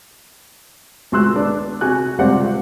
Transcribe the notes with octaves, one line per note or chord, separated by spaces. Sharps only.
C#2 F#4 C6 E6 F#6
B3 D4
C3 F#4 G#5 F#6
C#2 C3 G3 F4 C5 F#5